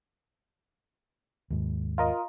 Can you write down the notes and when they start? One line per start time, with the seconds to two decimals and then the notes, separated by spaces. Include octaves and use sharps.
1.50 D#2 G#2
1.98 F4 A#4 D#5